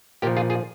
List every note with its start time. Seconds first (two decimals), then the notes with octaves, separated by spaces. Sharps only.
0.22 A#2 G4 A#4
0.27 F3
0.37 F4 G#4
0.50 F4 G#4